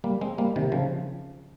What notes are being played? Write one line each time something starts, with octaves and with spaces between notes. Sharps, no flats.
G3 A#3
G#3 C4
G3 A#3
C3 D#3
C#3 F3